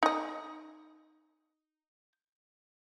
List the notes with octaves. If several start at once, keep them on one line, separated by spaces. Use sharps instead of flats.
D#4 D#5